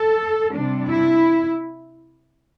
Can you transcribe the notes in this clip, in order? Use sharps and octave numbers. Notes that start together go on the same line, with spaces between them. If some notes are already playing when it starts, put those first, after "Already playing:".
Already playing: A4
C3 G3 D4
E4